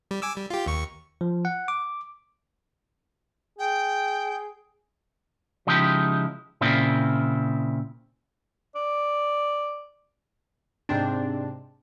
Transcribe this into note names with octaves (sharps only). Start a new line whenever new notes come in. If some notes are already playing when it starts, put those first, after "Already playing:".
G3
G#5 D6 E6
G3
F4 G4
D#2 C#6
F3
F#5
D6
G#4 G5
C#3 F3 G#3 D#4 E4 G4
A#2 C#3 C4 E4 F4
D5
G#2 C3 C4 D4